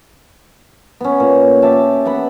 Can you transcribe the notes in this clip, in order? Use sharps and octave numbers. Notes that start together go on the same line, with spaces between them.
B3 C#4
A#2
G4 E5 A5
B3 F#5 B5